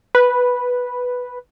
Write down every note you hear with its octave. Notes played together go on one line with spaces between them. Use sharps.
B4